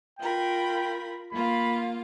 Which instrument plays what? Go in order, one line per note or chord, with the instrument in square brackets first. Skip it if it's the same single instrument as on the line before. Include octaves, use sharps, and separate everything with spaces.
[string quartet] F4 A#4 B5 [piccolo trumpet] G5
[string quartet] A#3 F4 F5 [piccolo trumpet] B5